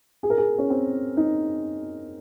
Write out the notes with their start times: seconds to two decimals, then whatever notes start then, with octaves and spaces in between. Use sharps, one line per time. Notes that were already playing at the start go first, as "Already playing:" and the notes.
0.23 G#4
0.30 A#4
0.38 G#4
0.58 C#4
0.70 C4
1.17 D#4